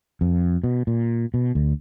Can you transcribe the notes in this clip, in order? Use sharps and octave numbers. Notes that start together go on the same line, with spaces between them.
F2
B2
A#2
B2
D2